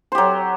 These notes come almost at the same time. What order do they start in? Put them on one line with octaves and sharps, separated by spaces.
C5 G4 F#3